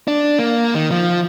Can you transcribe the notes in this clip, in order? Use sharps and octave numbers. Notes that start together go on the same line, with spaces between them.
D4
A#3
D#3
F3